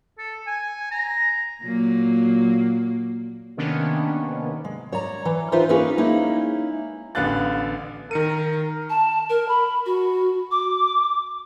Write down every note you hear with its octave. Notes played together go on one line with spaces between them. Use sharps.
A4
G#5
A#5
A#2 F#3 A#3
C3 D#3 A#3 B3 C#4 D4
G#3
C#5 D5 A#5
E3
D#4 F4 B4 C5 E5
A#3 C#4 D#4 F4 G#4 B4
G#3 A#3 C#4 D#4 E4
A1 D3 B3 F5 F#6 A6
D#3 A#4 C#7 D#7
A5
A#4
B5
F#4
D6